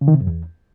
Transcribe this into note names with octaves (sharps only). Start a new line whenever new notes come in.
C#3
D#3
C3
F#2
E2